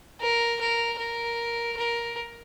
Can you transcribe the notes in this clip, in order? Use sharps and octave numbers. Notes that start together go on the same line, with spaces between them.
A#4
A#4
A#4
A#4